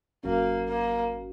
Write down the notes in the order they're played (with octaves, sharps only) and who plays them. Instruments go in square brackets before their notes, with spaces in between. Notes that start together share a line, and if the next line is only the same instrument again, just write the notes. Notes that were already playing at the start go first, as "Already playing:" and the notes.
[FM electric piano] G#1 F#2 F#3 C#4 F#4 [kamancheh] A#3
[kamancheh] A#3